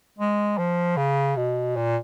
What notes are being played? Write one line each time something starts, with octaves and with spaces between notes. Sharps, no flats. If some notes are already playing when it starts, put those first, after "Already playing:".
G#3
F3
C#3
B2
A#2